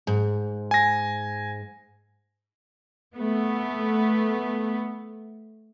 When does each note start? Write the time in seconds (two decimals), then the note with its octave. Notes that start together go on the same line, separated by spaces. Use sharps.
0.07 G#2
0.71 G#5 A#6
3.15 A3 B3